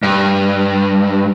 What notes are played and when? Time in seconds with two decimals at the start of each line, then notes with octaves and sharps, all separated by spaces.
0.03 G2